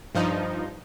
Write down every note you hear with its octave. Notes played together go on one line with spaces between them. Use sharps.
G2 F3 D#4